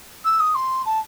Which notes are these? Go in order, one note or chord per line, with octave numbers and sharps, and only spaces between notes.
E6
D#6
C6
A5